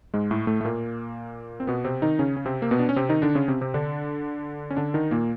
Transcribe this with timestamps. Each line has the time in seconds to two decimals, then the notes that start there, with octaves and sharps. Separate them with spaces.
0.14 G#2 G#3
0.31 A2 A3
0.47 A2 A3
0.61 A3
0.65 A#2 A#3
1.60 C4
1.67 B2 B3
1.84 C3 C4
2.02 D#3 D#4
2.19 C#3 C#4
2.36 C#4
2.45 C3 C4
2.62 A#3
2.71 B2 B3
2.79 D4
2.89 C#4
2.96 C3 C4
3.09 D#3 D#4
3.22 D3 D4
3.35 C#3 C#4
3.48 C3 C4
3.61 C3 C4
3.74 D3 D4
4.70 C#4
4.77 D3 D4
4.94 D#3 D#4
5.11 A#2 A#3